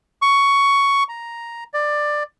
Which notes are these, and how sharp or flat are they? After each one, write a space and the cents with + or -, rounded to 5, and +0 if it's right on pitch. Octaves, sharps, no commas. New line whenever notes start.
C#6 +10
A#5 +5
D5 +15